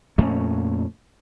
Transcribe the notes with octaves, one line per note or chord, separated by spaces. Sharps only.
F2 A#2 A3 C#4